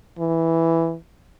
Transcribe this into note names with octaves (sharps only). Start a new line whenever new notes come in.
E3